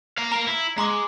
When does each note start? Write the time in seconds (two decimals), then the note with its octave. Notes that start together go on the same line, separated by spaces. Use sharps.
0.18 F5 A#5
0.32 A#4 F5 A#5
0.48 E4
0.78 G#3 A#5 C6 D6